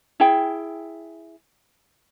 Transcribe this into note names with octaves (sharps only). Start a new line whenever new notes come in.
E4 G#4 G5